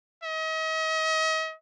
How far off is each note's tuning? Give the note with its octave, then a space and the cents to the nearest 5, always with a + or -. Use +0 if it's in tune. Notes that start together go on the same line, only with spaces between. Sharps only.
D#5 +40